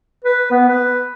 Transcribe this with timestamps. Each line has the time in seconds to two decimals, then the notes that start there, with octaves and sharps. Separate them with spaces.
0.24 B4
0.51 B3
0.68 B4